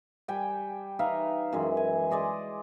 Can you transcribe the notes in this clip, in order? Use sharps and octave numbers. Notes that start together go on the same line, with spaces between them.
G3 G5 G#5
D#4 B4 E5 F5
F#2 E3 G#3
G#5
G#3 D5 D#5 C6